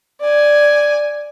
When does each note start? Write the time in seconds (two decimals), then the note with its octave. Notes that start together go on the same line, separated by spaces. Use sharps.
0.21 D5 G#5